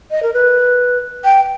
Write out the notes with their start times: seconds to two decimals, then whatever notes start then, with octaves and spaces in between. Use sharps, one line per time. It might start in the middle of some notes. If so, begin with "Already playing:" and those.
0.11 D#5
0.23 A#4
0.34 B4
1.25 G5